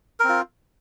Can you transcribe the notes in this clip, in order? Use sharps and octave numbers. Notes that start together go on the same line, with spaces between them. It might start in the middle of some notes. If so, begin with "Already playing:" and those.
C4 F4 A#4